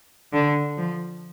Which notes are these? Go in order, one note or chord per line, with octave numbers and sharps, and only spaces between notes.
D3
F3